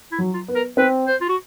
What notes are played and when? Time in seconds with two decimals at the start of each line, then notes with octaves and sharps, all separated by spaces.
0.12 E4
0.18 F#3
0.34 F4
0.48 B3
0.55 A#4
0.77 C4 B4
1.07 C5
1.21 F4
1.29 F#4